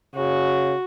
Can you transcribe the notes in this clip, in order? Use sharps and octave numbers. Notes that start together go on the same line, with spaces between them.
C#3 F#4